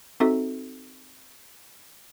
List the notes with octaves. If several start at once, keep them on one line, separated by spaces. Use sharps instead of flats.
C4 D#4 F#4 A4 E5